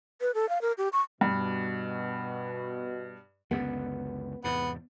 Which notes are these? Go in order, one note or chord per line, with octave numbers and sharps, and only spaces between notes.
B4
A4
F5
A#4
G4
C#6
G2 B2
C#2 F#2 D3 B3
E2 G#2 C3 B3